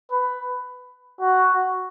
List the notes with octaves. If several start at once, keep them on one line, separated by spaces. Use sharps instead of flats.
B4
F#4